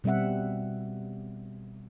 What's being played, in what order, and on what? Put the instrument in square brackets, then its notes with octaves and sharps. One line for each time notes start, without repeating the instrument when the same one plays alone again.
[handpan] B2 G3 C4 E5 F#5